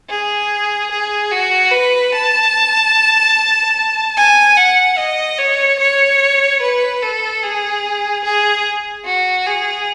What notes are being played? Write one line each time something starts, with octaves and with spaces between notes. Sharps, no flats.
G#4
G#4
F#4
B4
A5
G#5
F#5
D#5
C#5
C#5
B4
A4
G#4
G#4
F#4
G#4